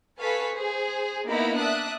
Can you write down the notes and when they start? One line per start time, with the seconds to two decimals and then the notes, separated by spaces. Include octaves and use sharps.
0.20 A4 B4 F5 G#5 C#6 B6
0.54 G#4 C5
1.28 A#3 B3 D#4 E4 A#5 B5
1.56 D4 E5 D#6 F#6